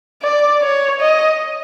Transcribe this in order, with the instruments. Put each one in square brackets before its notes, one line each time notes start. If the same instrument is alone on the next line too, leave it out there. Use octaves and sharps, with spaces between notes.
[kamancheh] D5
C#5
D#5